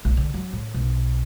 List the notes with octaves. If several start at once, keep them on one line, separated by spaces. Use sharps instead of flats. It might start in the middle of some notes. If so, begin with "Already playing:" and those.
A#1
D3
F#3
A2
B1